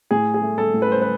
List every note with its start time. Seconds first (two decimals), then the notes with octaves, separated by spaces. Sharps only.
0.11 A2 G#4
0.34 G#4
0.42 A3
0.58 A4
0.74 A2
0.82 B4
0.92 C5
1.02 B4